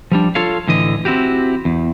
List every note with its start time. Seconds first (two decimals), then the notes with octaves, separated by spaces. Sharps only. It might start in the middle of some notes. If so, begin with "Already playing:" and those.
0.12 F3 G3 D4
0.35 F4 A4 C#5 F5
0.68 A2 D3 E3 D#5
1.05 C4 E4 F#4 G4
1.65 E2